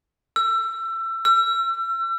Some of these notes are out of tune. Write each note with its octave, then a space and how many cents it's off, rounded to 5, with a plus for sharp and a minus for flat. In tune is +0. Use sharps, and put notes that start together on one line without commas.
E6 +25
E6 +40